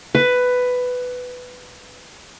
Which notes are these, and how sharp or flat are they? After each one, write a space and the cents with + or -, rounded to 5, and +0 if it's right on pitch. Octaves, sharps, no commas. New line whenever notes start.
B4 +10